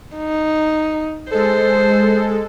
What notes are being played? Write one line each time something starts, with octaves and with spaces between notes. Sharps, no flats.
D#4
G#3 A4 C5